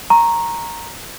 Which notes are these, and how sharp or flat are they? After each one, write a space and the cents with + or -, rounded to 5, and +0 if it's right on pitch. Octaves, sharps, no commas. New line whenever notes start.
A#5 +0 C#6 -30